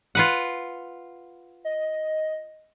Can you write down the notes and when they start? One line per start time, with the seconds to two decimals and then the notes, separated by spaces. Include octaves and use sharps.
0.15 F4 B4 F#5
1.65 D#5